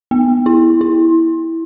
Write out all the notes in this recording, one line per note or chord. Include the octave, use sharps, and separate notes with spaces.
B3
E4
E4